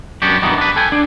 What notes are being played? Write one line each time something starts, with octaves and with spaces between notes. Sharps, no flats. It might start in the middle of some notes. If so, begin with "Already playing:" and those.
F#2 B3 D4 F#4 G4
G2 B2 D#3 E3 B3 D#4
D4 B4
A4 G5 G#5
D4